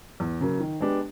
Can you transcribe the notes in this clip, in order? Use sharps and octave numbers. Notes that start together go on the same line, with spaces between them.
E2
C#3 F#3 A#3
D#3
G#3 B3 D4 G4